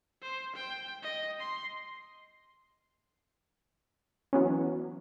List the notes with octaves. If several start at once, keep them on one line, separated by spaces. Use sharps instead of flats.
C5
G5
D#5
C6
E3 F#3 B3 C#4